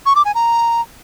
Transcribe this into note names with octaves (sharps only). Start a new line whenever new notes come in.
C#6
D6
G#5
A#5